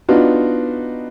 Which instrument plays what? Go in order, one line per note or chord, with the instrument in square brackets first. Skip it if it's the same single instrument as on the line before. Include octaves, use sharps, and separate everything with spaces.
[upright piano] B3 D4 D#4 F4 F#4